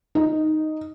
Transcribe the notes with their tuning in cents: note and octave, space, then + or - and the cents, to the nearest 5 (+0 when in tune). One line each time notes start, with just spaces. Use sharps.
D#4 +0